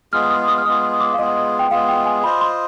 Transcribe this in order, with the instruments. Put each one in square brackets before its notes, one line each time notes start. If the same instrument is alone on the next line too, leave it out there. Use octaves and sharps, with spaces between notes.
[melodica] G#3 B3 F4 G#4 [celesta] F6
[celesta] F6
D#6
D#6
F6
[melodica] G#3 B3 F4 G#4 [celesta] D#6
[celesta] D#6
D6
F5
[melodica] G#3 B3 F4 G#4 [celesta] D#5
[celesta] G5
[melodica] G#3 B3 F4 G#4 [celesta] F5
[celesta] G5
G#5
[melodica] F4 C5 D#5 [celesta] B5
[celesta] C6